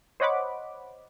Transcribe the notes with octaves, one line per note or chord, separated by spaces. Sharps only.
C5 C#5 D#5 F#5 B5 D6